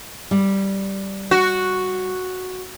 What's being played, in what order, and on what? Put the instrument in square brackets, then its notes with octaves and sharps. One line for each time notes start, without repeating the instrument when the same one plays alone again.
[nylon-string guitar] G3
[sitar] F#4